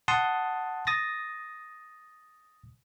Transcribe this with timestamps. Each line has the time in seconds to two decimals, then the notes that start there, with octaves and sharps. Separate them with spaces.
0.08 F#5 A5 C6 D#6
0.87 D#6 A6 A#6